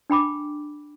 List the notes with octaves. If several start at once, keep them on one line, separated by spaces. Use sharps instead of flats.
D4 G5 B5 D6